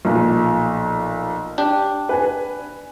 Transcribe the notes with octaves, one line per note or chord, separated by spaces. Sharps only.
B1 A#2 F3
D4 G4
B4 G#5